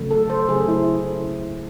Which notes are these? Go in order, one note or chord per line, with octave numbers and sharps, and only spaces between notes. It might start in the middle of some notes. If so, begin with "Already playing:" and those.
Already playing: C#3 F#3 A3
A4
C5
C#3 F#3 A3 G#4
E4